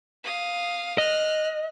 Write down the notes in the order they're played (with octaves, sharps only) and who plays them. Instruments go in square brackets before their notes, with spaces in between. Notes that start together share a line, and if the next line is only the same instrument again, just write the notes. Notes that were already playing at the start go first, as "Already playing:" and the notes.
[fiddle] F5 D#6
[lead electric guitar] D#5 [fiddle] F6 F#6